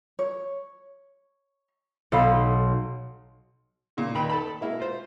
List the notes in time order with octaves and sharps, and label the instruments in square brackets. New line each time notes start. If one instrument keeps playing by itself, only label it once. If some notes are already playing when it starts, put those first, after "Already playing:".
[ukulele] C#5
[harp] B1 [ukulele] A4 F5 B5
[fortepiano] A#2 C#3
D#2 A#2 D#4 G5 B5
A4 A5 B5
G#3 A#3 E4 F#4
F4 C5